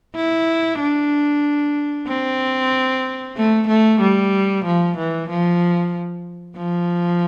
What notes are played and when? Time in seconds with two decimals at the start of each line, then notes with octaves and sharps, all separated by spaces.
0.16 E4
0.80 D4
2.08 C4
3.37 A3
3.68 A3
4.01 G3
4.65 F3
4.97 E3
5.29 F3
6.57 F3